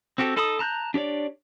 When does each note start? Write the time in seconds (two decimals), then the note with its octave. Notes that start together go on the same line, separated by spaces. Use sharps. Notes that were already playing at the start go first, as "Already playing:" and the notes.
0.18 C4 F#4 G4 A4
0.36 D#4 A4 A5 B5 D#6
0.59 A5 A#5 F#6 G6
0.94 D4 G4 C#5 D5